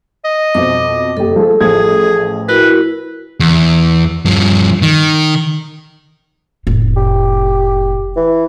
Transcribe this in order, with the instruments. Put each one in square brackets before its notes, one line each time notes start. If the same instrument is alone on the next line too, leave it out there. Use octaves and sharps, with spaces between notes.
[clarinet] D#5
[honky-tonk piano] F2 B2 C5 [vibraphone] D6
[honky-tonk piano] F#1 G4 [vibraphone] A4
[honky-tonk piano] F3 A3 G#4
[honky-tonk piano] A1 F3 G#6 [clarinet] G#4
[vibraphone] E4 F#4 A#4 [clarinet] B4
[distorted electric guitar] E2
G2 F3
D#3
[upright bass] F1 A2
[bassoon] G4
E3